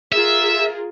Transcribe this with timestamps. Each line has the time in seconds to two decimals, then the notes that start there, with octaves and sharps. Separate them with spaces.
0.12 F4 G#4 A#4 E5